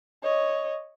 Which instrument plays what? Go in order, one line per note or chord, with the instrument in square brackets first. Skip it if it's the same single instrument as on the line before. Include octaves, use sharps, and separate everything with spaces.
[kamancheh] C#5 D#5